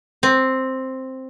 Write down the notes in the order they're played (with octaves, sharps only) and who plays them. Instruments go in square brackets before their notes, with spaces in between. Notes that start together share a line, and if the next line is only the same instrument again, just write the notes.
[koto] C4